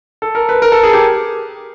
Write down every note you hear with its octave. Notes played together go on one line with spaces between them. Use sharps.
A4
A#4
B4
A#4
A4
G#4
G4